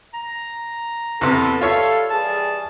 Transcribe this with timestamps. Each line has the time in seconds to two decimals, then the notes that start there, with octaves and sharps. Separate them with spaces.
0.14 A#5
1.21 E2 C3 B3 A4
1.61 G3 F4 A4 C#5 E5 F5
2.11 E3 G3 G#4 A5